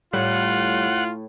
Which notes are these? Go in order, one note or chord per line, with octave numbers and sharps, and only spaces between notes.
A2 G3 F4 F#5